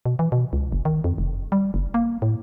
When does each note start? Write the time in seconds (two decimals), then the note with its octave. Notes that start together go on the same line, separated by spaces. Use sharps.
0.06 B2
0.19 E3
0.32 B2
0.53 C#2
0.72 F#1
0.85 D#3
1.04 F2
1.18 F1
1.52 G3
1.74 F#1
1.94 A#3
2.22 A2